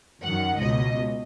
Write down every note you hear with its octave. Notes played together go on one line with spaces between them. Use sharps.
F#2 D#3 F#5
C#2 B2 D#5